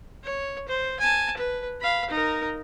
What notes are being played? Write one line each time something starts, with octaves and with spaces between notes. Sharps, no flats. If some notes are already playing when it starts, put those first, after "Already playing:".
C#5
C5
G#5 A5
B4
F5 B5
D#4 A#4